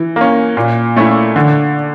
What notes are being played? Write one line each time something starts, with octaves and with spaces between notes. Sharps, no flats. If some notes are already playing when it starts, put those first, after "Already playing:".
Already playing: E3
A#3 C#4
A#2
A3 C#4 E4
D3